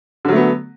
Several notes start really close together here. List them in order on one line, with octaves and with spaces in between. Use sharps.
D3 F#3 A3 B3